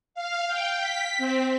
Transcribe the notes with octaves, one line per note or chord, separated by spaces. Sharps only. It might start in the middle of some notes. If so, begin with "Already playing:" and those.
F5
G5
B6
C4